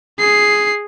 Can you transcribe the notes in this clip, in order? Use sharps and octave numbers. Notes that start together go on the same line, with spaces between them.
G#4 C7